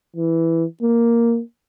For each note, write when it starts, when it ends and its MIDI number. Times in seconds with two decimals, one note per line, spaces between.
0.16 0.64 52
0.82 1.41 58